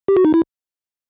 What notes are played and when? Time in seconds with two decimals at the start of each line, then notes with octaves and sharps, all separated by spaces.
0.08 G4
0.17 F#4
0.25 D#4
0.34 E4